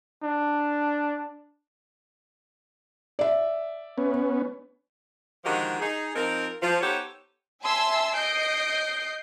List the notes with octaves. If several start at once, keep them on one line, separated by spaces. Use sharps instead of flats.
D4
D5 E5
B3 C#4
D3 D#3 F3 G#3 F#4 G4
D#4 G#4
F3 C4 D#4 A#4
F3
B3 D#4 G4 A4 C5 C#5
E5 G#5 A5 C6 E6
D#5 G6 C7 D7